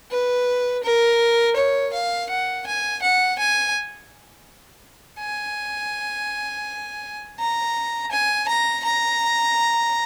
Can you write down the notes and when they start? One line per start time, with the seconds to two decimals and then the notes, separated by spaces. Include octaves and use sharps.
0.11 B4
0.83 A#4
1.56 C#5
1.93 F5
2.30 F#5
2.66 G#5
3.02 F#5
3.39 G#5
5.20 G#5
7.39 A#5
8.11 G#5
8.48 A#5
8.84 A#5